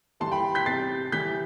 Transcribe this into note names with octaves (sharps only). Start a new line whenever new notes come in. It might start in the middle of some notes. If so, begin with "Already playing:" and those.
A2 E3 G3 A5 C6
G5 B5
G6 B6
C3 G3 A6 C7
A2 E3 G3 G6 B6